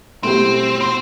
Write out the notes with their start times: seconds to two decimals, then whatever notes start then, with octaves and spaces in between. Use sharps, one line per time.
0.23 B2 A3 C4 E4 G4
0.81 C4